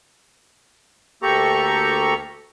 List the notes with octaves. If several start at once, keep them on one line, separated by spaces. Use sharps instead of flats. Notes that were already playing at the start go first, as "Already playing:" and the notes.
D2 A#3 G4 A4 A#5 C#6